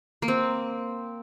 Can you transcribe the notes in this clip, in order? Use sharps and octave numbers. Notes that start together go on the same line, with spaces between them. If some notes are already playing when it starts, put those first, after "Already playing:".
A#3
C4